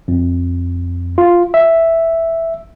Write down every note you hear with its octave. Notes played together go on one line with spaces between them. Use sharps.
F2
F4
E5